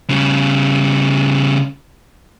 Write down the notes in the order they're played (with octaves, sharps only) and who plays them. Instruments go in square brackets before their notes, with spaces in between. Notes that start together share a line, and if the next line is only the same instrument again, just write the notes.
[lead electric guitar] C#3 G3